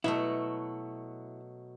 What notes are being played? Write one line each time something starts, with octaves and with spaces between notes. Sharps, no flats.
B2 F#3 A3 E4